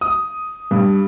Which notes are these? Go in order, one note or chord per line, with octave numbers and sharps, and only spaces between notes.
D#6
G2